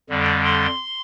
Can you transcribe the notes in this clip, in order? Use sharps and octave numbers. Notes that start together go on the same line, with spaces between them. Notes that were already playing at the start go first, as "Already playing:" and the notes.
F2 D3 G3
C6